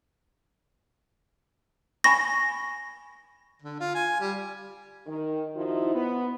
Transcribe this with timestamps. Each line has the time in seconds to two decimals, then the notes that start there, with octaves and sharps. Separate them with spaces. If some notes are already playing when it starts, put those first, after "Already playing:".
2.04 G#5 B5 C#6 A#6
3.62 D3
3.80 F4
3.95 G#5
4.20 G3
5.07 D#3
5.56 F3 D#4 E4 F#4
5.95 B3